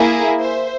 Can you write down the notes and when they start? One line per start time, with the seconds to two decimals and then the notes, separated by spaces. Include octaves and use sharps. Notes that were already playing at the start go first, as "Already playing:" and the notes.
Already playing: A#3 E4 G#4
0.40 C5 E5